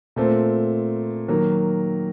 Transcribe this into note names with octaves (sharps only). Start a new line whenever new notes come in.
A#2 A3 C4
D#3 F#3 A#3